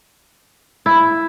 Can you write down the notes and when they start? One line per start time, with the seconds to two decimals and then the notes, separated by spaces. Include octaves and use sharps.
0.86 E4